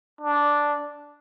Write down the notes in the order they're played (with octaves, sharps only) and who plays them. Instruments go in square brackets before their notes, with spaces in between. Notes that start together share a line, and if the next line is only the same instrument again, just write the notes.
[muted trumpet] D4